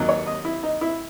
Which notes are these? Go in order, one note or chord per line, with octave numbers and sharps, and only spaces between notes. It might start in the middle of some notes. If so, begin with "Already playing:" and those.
Already playing: D#2 D#3 F#3
C#5
D#5
E4
D#4
E4